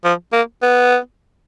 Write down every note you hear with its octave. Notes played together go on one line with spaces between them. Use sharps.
F3
A#3
B3